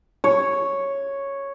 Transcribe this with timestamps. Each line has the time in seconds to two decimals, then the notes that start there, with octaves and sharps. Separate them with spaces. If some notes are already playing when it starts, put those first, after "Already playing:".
0.24 C#5